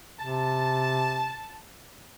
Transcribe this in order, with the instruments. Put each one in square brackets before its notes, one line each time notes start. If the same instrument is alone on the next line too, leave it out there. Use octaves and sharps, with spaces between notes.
[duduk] C3 [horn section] A5